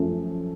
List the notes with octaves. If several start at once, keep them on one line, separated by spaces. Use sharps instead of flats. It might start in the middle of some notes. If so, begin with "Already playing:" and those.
Already playing: F#2 F3 A3 C#4